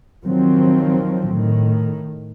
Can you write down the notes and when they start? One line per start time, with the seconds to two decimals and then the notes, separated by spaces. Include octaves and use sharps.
0.25 D#3 F3 F#3 C4
1.29 A2 D#3